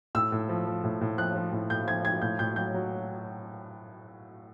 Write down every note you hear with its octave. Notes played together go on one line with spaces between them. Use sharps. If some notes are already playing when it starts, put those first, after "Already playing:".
A2 E6
A2
F3
F3
A2
A2
F3 F#6
F3
A2
A2 G6
F3 G#6
F3 G#6
A2 G6
A2 G6
F#3 G6
F#3